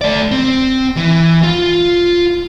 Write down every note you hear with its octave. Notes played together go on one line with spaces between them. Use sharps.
A3 D5
C4
E3
F4